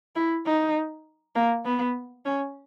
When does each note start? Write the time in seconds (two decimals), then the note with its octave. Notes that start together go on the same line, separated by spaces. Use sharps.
0.16 E4
0.46 D#4
1.35 A#3
1.65 B3
2.25 C#4